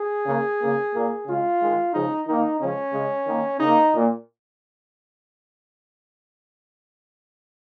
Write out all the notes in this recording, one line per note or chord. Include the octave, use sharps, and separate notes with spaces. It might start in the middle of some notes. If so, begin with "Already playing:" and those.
Already playing: G#4
C#3 A#3
C#3 A#3
A#2 A#3
C#3 G#3 F4
D#3 G#3
C#3 F3 G#3 D#4
D#3 A#3 D#4
C#3 F3 G#3 C#4
C#3 G#3
D#3 A#3
C#3 A#3 D#4
A#2 A#3